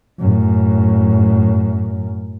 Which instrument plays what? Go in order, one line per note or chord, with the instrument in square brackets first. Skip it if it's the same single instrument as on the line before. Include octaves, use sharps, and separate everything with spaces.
[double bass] F#2 A2